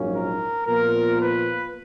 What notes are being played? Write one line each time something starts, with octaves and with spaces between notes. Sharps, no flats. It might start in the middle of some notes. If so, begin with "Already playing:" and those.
Already playing: A#1 G#2 F#3 A#3 C#4
A#4
A#2 F3 B3 F4 A#4
B4